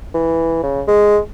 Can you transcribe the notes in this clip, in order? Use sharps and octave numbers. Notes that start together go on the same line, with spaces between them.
E3
C#3
G#3